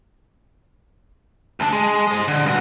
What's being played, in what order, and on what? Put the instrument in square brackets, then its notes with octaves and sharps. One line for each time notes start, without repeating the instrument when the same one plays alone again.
[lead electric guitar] D2 D4
G#3
C5 D#5
D3
G2 F#4